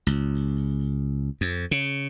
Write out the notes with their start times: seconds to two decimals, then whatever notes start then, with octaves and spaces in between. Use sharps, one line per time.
0.07 C#2
1.41 F2
1.71 C#3